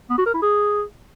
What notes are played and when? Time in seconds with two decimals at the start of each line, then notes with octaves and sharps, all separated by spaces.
0.10 B3
0.18 F#4
0.26 A#4
0.34 E4
0.42 G#4